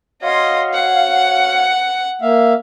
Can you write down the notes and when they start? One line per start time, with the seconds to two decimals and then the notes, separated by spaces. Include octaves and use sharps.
0.22 F#4 C#5 D#5 F5 C6
0.73 F#5
2.21 A#3 E5 F5